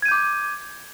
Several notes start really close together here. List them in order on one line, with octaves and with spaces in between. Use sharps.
G#6 D#7 G6 D6